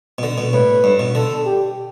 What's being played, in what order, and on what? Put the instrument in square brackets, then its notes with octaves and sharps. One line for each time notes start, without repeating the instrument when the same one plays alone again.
[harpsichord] B2
D3
B2
[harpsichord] A2 [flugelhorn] B4
[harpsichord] G2
B2
[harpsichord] D3 [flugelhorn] A4
[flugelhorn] G4